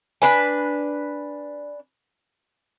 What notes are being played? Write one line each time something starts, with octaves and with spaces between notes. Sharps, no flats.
D4 B4 G#5